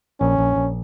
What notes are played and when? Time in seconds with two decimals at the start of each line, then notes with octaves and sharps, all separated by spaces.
0.20 A#1 C#4
0.38 A#1
0.56 A#1